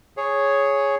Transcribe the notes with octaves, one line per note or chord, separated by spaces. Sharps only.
G#4 C#5